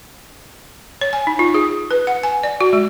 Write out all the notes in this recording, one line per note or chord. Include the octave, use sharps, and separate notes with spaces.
C#5
G#5
D#4
F4
G#4
B4
F#5
G#5
D5
F#4
G#3